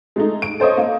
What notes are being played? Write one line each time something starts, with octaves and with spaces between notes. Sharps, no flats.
G#3 A3 D#4
D7
A4 C5 C#5 D#5
A#3